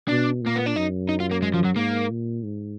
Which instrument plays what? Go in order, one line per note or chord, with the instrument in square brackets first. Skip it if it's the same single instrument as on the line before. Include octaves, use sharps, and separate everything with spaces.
[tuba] B2 [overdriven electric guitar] D4
[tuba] A#2 [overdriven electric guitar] A#3
[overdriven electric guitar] B3
D4
[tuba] F#2 [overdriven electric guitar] D#4
[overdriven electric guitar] D#4
F4
A#3
G#3
F3
F#3
[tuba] G#2 [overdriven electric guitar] A#3
[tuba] A#2
G#2